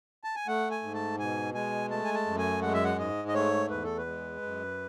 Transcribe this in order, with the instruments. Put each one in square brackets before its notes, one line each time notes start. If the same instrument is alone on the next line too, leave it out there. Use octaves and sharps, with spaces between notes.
[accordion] A5
G#5
A3 F#5
G#5
G#2
A5
B2 G#5
G#3 G#5
A3 A5
G#5
A5
F#2
G#5
G#3 F#5
E5
F#5
G#2 D#5
D#5
A3 C#5
E2 B4
A4
B4
G#3
F#2